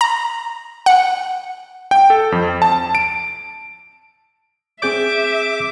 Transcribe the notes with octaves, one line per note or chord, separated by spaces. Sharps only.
A#5
F#5
G5
A4
F2
A5
D7
C4 G#4 E5 D6 G6